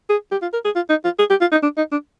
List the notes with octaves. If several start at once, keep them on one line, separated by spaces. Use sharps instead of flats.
G#4
G4
F4
A#4
G#4
F4
D#4
F4
G#4
G4
F4
D#4
D4
D#4
D4